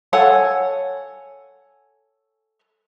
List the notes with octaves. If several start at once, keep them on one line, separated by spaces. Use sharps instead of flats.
A4 C#5 F#5 G#5